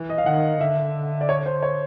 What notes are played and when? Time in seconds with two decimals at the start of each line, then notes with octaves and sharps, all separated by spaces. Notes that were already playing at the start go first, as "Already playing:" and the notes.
Already playing: E3
0.10 D#5
0.18 F5
0.26 D#3 F#5
0.61 D3 E5
1.21 D5
1.29 C#5
1.46 C5
1.63 C#5